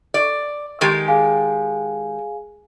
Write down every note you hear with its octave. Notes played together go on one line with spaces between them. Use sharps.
D5
D#3 G#3 G4
G#4 F5 G#5